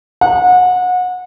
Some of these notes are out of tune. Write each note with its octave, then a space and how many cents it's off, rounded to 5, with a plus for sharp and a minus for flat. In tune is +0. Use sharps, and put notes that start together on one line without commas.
F#5 -30